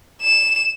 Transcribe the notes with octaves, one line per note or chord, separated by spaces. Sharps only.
E7